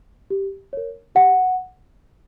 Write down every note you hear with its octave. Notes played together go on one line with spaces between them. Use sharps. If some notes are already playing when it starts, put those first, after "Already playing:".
G4
A#4 C#5
G4 F#5